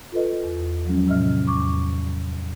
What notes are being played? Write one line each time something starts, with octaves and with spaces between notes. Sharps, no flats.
F4 A4 B4 D#5
E2
F3 F#3 G#3 C#4
A2 C3 D#5 E5 F6
E2 C#6 D6